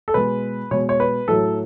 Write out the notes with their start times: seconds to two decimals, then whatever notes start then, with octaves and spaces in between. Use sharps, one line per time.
0.08 A4
0.14 B2 G#3 B4
0.71 B2 G#3 C#5
0.89 C#5
1.00 B4
1.28 A2 F#3 A4